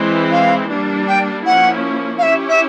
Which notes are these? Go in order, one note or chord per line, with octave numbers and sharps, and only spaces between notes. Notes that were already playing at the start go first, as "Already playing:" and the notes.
Already playing: E3 G#3 C4 E4
F5
G3 A#3 D4
G5
F3 A#3 C#4 E4 F#5
F5
C#4 E4 G4 E5
E5